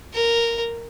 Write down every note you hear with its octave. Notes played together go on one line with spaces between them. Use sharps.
A#4